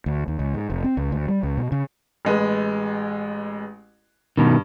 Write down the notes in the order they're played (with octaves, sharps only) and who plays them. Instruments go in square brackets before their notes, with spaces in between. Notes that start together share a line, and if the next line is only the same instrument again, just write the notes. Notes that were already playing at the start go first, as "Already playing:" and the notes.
[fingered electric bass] D2
D#2
C#2
G#2
F1
C4
C#2
D2
G3
C#2
B2
C#3
[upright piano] A1 G#3 B4
[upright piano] G2 [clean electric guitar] B2 D#3